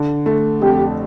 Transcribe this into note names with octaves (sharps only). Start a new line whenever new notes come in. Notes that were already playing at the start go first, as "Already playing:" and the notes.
Already playing: D3
A3
F2 G4